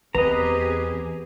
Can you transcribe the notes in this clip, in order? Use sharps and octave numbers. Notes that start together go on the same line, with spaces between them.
E2 C4 G4 G#4 B4 D#5 A#5